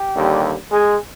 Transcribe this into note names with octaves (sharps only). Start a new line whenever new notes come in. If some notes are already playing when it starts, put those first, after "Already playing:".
Already playing: G4
D#2 D3 G3
G#3 G#4